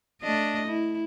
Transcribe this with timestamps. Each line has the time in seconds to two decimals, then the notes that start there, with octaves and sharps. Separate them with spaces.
0.22 A3 D4 D#5
0.67 E4